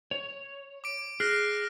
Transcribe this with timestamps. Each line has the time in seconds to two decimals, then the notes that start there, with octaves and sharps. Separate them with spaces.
0.11 C#5
0.84 D6 D7
1.20 G#4 F6 F#6 A#6